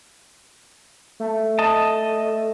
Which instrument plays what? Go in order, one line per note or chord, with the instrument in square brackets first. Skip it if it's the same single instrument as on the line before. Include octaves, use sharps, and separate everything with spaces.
[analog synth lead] A3
[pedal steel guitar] D#5 A5